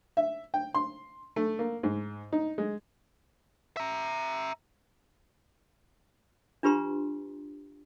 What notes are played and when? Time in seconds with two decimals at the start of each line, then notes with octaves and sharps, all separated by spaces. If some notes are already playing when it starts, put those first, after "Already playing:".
0.17 E5
0.54 G5
0.75 C6
1.36 A3
1.59 A#3
1.83 G#2
2.33 D#4
2.58 G#3
3.77 E5 A#5
6.63 D4 F4 G4 B4 A#5 C6